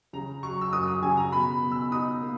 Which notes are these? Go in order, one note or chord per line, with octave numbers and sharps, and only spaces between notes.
C#3 A#5
F#3 C#6
E6
F#2 D#6
D#6
C#3 G#5
A#5
B2 B5
B2
E6
D#4 D#6
A#3